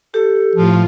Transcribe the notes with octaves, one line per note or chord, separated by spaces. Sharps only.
G4 A4
A2 F3 F4